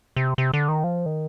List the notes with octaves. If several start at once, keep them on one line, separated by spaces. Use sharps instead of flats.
C3
C3
D3
D#3
F3
D#3